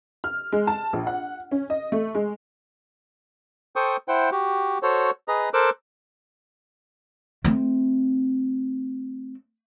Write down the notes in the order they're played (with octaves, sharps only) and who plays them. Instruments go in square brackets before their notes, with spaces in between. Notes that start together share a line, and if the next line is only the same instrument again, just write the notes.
[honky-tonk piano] F6
G#3
A5
A#1
F#5
C#4
D#5
A3
G#3
[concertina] A4 C5 G5 C#6 D#6
E4 C5 F#5 G5
F#4 G4
F#4 A4 C5 C#5
G#4 B4 D#5 A#5
A4 A#4 C5 D6 E6 F#6
[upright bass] A3 C4